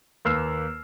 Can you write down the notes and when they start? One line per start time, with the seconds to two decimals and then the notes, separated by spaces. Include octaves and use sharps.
0.25 D#2 A#3 B4 E6 F6 C7